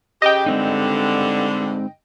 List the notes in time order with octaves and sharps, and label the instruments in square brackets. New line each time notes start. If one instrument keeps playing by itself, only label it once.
[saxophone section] C#3 G4 [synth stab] D#5 G5
[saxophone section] G2 D3 [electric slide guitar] G#3 C4 D#4